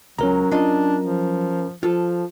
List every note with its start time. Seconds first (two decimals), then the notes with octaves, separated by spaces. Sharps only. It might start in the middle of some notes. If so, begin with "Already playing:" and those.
0.19 C#2 F#3 C#4 A#4 A#5
0.51 F#3 D4 F4 D#5
1.04 F3
1.83 F3 F4 A4